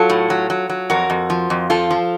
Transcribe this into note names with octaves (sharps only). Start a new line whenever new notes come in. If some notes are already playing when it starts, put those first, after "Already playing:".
Already playing: F#3 F4 A4
A2
F#3
F#3
F#3
F2 F#4 A#4
F2
F3
F2
F3 F4 A4
F3